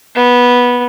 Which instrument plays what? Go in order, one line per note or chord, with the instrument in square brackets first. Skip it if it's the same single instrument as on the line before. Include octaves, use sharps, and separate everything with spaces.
[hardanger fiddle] B3